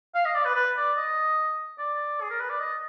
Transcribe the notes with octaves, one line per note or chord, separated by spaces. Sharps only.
F5
D#5
D5
B4
B4
D5
D#5
D5
G#4
A#4
B4
D5
D#5